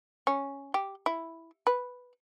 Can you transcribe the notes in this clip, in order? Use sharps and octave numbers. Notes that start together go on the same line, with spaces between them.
C#4
G4
E4
B4